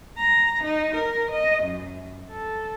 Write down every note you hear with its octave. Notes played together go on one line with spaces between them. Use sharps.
A#5
D#4
A#4
D#5
F#2
A4